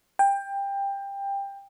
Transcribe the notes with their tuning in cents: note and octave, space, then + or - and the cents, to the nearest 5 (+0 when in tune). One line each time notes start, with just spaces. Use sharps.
G5 +20